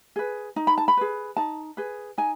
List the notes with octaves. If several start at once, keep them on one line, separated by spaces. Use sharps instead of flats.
G#4 B4
D#4
B5
A5
B5
G#4 B4
D#4 A5
G#4 B4
D#4 G#5